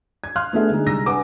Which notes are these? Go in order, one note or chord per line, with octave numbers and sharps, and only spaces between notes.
G#6
F5 C6 F6 F#6
A3 B3 D4 G#4 A4 E5
D3 G#3 D#4 G#4
C2 G#3 A#5 E6 A#6
D4 B4 F#5 G#5 D6